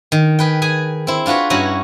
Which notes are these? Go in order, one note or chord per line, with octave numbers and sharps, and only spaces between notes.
D#3
G#4 B4 G5
G#4 G#5
C4 E4
D4 F4 F#4 B4 C#5
G2 C#4 E4 F#4 G#5 A#5